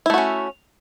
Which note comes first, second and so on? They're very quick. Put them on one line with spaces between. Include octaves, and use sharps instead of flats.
E4 A3 F#4 C#4